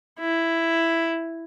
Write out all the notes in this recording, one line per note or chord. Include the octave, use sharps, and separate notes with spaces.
E4